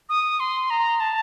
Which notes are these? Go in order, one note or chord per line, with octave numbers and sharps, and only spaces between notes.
D#6
C6
A#5
A5